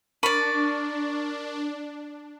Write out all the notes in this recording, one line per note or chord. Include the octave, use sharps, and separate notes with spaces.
D4 A#4 D5 B5 C#6 D#7